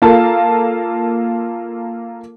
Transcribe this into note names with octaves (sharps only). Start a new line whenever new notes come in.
A#3 F4 A4 A#4 F5 A5